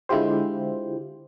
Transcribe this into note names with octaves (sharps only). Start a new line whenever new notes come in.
D3 G#3 E4 F4 G4 C5